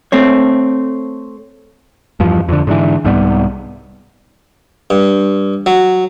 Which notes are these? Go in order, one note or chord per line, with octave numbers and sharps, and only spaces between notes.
A3 C4 C#5
E2 G2 F3
F2 D3
G#2 D3 E3
C2 G#2 G3 B3
G2
F#3